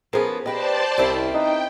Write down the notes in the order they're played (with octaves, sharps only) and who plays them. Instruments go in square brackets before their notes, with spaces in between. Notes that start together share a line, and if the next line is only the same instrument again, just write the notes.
[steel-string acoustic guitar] F3 B3 [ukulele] C#4 G#4 A#4
[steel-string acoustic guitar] G4 B4 [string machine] C5 D5 A5 [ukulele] D#5 G5
[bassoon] C2 [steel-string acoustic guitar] C4 C#4 E4
[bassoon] D#4 [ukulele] B4 [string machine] G5